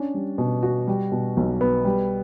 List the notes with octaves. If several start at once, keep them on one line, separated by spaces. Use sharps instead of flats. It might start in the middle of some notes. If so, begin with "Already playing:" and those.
Already playing: C#4 D4
G3
B2
F#4
G3
B2
B1
B3
G3